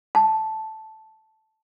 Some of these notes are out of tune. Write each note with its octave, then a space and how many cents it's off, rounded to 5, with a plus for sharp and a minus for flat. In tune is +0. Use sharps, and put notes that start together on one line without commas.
A5 -5